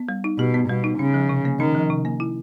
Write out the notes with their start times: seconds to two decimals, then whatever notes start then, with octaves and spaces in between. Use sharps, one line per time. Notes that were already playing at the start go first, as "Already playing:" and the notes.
Already playing: B3
0.09 G3
0.24 D#4
0.39 B2 G4
0.54 B3
0.69 B2 G3
0.84 D#4
0.99 C#3 C#4
1.14 F3
1.29 C3
1.45 A#3
1.60 D#3 C#4
1.75 F3
1.90 C3
2.05 A#3
2.20 E4